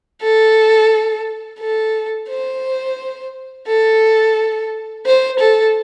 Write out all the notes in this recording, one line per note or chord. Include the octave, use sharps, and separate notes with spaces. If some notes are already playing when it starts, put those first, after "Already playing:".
A4
A4
C5
A4
C5
A4